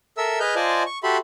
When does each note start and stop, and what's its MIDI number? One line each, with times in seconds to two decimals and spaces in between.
0.18 0.39 69
0.18 0.39 70
0.18 0.39 76
0.18 0.39 88
0.40 0.55 68
0.40 0.55 71
0.40 0.55 75
0.40 0.55 89
0.40 0.55 91
0.56 0.83 65
0.56 0.83 72
0.56 0.83 74
0.56 0.83 75
0.56 0.83 80
0.56 0.83 81
0.86 0.98 85
1.04 1.18 66
1.04 1.18 67
1.04 1.18 69
1.04 1.18 76
1.04 1.18 83
1.04 1.18 84